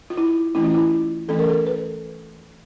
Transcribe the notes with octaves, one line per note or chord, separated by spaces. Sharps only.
F4
E4
E3 A3 C#4 E4
F4
E4
E3 A3 C#4 A4
A#4
A4
B4